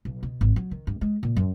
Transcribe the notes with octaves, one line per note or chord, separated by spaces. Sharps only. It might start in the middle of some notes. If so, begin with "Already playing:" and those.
B1
B2
G#1
F#3
D#3
G2
G#3
A#2
F#2